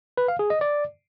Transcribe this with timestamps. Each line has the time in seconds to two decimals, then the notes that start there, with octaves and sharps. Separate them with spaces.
0.17 B4
0.28 F5
0.39 G#4
0.50 D#5
0.61 D5